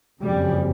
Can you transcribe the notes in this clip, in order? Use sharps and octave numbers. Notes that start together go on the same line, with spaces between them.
F#1 F2 C#3 G3